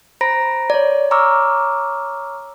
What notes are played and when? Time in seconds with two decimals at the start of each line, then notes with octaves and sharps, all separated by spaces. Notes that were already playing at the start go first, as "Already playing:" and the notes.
0.21 C5 A#5 B5 A#6 D7
0.70 C#5 D5
1.11 C#5 A#5 C#6 D6 E6 F6